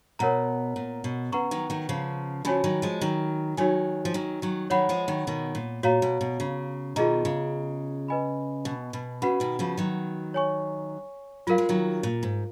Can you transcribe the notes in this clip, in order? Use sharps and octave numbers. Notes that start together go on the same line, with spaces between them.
B2 A#4 C#5 F#5 A#5
A#2
B2
C#3 B4 F#5 A#5 C#6
D#3 F#3
D#3 F#3
C#3 F3
C#3 F3 F#4 C#5 G#5 B5
D#3 F#3
F3 G#3
D#3 F#3
D#3 F#3 D#4 F#4 C#5 G#5
F3
D#3 F#3
D#3 F#3
D#3 F#3 C#5 F#5 B5
F3 G#3
D#3 F#3
B2 D#3
A#2
A#2 F#4 C#5 F5 A#5
B2
B2
C#3
B2 D#3 F4 G#4 D#5 A#5
C#3
B4 D#5 G#5 B5
B2
B2
C#3 F#4 B4 F#5 B5
B2 D#3
C#3 F3
D#3 F#3
C#5 G#5 C#6
F#3 F4 A#4 F5
G#3
D#3 F#3
A#2
G#2